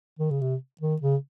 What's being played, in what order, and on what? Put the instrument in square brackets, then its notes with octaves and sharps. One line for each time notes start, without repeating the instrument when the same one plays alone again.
[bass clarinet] D#3
C#3
C3
D#3
C#3